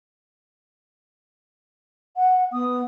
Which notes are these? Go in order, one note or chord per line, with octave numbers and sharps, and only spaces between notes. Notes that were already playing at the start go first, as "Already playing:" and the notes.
F#5
B3 D#6